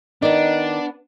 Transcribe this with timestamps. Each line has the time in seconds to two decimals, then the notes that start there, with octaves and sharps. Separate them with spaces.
0.22 D#3 B3 D4 D#4 D5